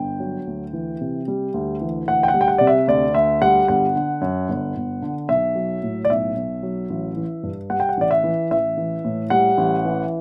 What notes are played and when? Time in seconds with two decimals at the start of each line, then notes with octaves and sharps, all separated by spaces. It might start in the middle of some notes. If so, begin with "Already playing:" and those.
Already playing: G1 G5
0.20 F#3
0.47 D2
0.73 E3
1.01 C3
1.28 G3
1.54 D2
1.81 E3
2.07 D2 F#5
2.23 G5
2.28 F#5
2.34 G3
2.41 G5
2.48 F#5
2.58 C3 D5
2.67 E5
2.87 D2 D5
3.15 D2 E5
3.42 G3 F#5
3.68 G1 F#5
3.96 D3
4.21 F#2
4.48 G1
4.76 G1
5.02 D3
5.29 B1 E5
5.56 F#3
5.83 A2
6.05 D5
6.10 B1 E5
6.36 B1
6.63 F#3
6.90 A1
7.17 E3
7.43 G2
7.70 G3 F#5
7.80 G5
7.89 F#5
7.97 A1 D5
8.11 E5
8.24 E3
8.51 A1 E5
8.77 E3
9.04 A2
9.30 G3 F#5
9.57 A1
9.85 E3